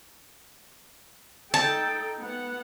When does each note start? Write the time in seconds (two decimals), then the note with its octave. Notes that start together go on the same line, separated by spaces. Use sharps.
1.54 D#4 A4 G5 A5
2.22 B3 F#5